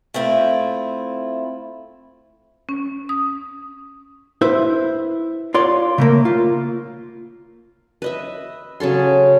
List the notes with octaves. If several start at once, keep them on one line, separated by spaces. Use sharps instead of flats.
A3 C4 E4 F4
C#4
D#6
E4 B4 C5 E5
F4 C#5 D5 F5 C6
C#3 A3 A#3
F4
B4 D#5 E5
C#3 F#3 A4 C6